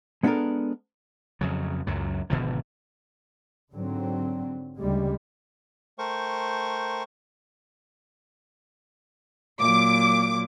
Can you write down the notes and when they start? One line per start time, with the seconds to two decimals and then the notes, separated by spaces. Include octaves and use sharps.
0.23 G#3 B3 D4 G4 A4 A#4
1.41 F2 C#3 F#3
1.87 C#2 F#2 F#3
2.30 G#1 B2 D3 F3
3.71 G#2 D3 F#3 C4
4.78 D2 C#3 G3 G#3
5.99 A3 A#4 C5 G5 C#6
9.59 A#2 F#3 D6